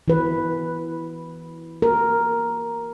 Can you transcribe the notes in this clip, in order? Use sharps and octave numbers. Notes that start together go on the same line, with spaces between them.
E3 B4
A#4